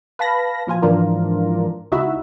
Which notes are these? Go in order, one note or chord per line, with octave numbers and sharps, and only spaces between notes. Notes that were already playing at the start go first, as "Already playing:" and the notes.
B4 F5 A5 B5 A#6
A#2 F3 F4 G#5
G#2 E3 F3 D4 F4 A#4
C#2 D#4 E4 F#4 E5